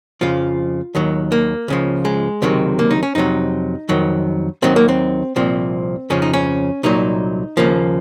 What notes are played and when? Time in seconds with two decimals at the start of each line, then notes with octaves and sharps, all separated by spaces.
0.21 F2 C#3 F3 F4
0.95 D#2 D#3 F#3
1.32 A#3
1.68 C#2 C#3 F3
2.05 G#3
2.42 C#2 C3 D#3 F#3
2.79 A#3
2.91 D#4
3.03 C#4
3.15 F2 C3 F#3 D#4
3.89 F2 D#3 F#3
4.62 D#2 D#3 F#3 C4
4.76 A#3
4.89 C4
5.36 C2 A#2 F3 C4
6.10 F2 C#3 F3 C#4
6.22 D#4
6.33 C#4
6.83 C2 A#2 F#3 D#4
7.57 D#2 C#3 F3 A#3